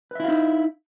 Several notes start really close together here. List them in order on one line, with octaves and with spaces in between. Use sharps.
B4 E5 E4 F5 D#4